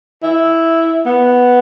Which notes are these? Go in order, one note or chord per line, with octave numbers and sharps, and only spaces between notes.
E4
B3